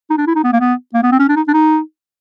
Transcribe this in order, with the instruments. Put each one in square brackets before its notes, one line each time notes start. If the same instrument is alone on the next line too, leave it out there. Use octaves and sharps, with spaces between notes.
[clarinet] D#4
D4
E4
D#4
B3
A#3
B3
A#3
B3
C4
C#4
D4
D#4
D4
D#4